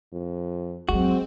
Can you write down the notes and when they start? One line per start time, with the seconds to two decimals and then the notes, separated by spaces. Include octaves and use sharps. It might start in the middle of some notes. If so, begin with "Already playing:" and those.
0.12 F2
0.89 F2 F#3 G#3 C4 F#4